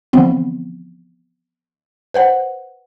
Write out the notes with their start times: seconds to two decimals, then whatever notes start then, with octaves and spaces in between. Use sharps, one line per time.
0.13 D3 E3 F3 B3 C4
2.14 B4 C5 F#5